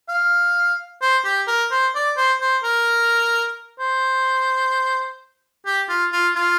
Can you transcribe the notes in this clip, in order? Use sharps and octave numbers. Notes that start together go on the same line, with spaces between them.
F5
C5
G4
A#4
C5
D5
C5
C5
A#4
C5
G4
F4
F4
F4